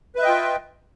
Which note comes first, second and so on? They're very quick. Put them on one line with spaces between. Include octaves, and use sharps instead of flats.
B4 E5 D#5 G5 F4